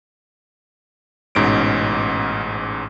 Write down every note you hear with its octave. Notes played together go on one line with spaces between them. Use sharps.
A1 G#2 B2 C#4 D7